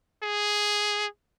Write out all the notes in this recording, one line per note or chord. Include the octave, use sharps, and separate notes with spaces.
G#4